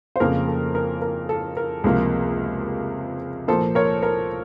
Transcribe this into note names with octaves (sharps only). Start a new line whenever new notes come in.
C5
F2 C#3 F3 A#3 A#4
A4
A#4
A#4
A4
A#4
C#2 C3 F3 A#3
A#2 F3 A#3 A4 C5
A#4 C#5
A#4